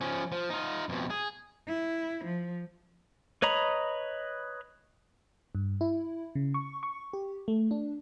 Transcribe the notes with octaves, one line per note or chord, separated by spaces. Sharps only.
F3 C#4
F3
D#4 F4
F2 B2
G#4
E4
F3
B4 C#5 D#5 A#5 B5
G2
E4
C#3
C#6
C#6
G4
A3
D4